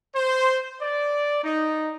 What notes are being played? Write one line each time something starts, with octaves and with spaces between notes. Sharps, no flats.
C5
D5
D#4